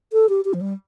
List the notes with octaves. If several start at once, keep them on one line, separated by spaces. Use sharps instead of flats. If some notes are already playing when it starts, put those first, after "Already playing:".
A4
G4
G4
F3
G3